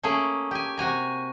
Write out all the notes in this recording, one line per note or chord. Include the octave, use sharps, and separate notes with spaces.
A3 A#3 C#4 G#4
G4 G#5
C3 F#4 G#5 A#5